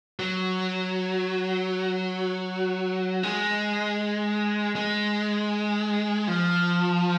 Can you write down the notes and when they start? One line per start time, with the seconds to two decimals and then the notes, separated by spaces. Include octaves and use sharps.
0.20 F#3
3.23 G#3
4.76 G#3
6.28 F3